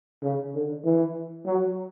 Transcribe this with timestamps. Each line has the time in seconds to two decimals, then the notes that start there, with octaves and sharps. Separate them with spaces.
0.23 C#3
0.55 D3
0.84 E3
1.46 F#3